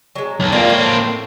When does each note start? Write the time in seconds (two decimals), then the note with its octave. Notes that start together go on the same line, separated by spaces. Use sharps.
0.15 F#3 G#3
0.40 B1
0.52 A#3 C4 D4 E4 F4
0.70 A2